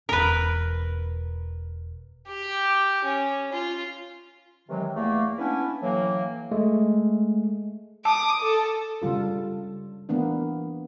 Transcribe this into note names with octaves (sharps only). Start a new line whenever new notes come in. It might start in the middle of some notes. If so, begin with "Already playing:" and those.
E1 C#4 A#4 B4
G4
C#4
F4
C3 D#3 E3 F#3 G#3
E2 A3 A#3
B3 C#4 D4 E4 B4
A2 E3 F#3 A#3
G#3 A3
A5 D6 D#6
A4
C#3 G3 F4 A4
E3 A#3 B3 D4